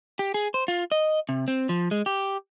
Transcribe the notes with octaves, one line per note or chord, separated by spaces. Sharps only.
G4
G#4
C5
F4
D#5
C3
C4
F3
G#3
G4